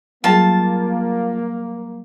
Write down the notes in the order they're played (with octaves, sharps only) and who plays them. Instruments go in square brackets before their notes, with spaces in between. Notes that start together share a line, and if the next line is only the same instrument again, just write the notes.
[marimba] F#3 G3 G#4 [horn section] A#3 [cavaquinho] F4 A5